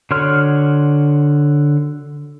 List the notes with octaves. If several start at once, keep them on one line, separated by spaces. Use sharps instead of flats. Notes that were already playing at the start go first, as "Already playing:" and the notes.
D3 F#4 C#5 C6 F6